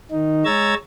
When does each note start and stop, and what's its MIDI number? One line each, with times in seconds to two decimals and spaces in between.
0.11 0.43 51
0.11 0.43 63
0.45 0.74 56
0.45 0.74 73
0.45 0.74 82
0.45 0.74 88
0.45 0.74 92
0.45 0.74 93